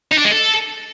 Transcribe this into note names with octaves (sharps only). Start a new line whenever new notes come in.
D#4
D4
G#3
A4